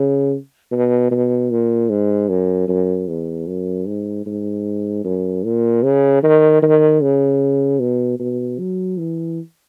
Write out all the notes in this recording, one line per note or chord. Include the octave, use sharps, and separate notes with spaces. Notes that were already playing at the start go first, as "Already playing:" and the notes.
Already playing: C#3
B2
B2
A#2
G#2
F#2
F#2
E2
F#2
G#2
G#2
F#2
A#2
C#3
D#3
D#3
C#3
B2
B2
F#3
E3